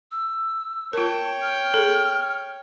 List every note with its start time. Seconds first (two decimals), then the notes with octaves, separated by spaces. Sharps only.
0.11 E6
0.93 F4 A#4 C#5 G5 A5
1.42 F6
1.74 G#4 A4